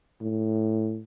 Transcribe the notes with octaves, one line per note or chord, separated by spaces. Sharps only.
A2